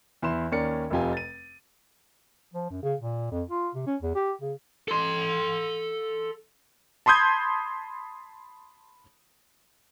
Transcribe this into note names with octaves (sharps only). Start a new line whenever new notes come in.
E2 E4 B5 C6 E7
D#2 C#4 A#4 D5 C#7
F1 F2 C3 F4 G4 G#5
A6 D#7
F3
F#2
C#3
A#2
F2
F4
C3
C#4
E2
G4
C#3
A4 C6
A5 B5 C6 D#6 G6 G#6